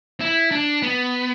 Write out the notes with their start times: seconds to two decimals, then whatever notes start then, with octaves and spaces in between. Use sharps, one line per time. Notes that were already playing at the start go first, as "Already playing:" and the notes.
0.20 E4
0.51 D4
0.82 B3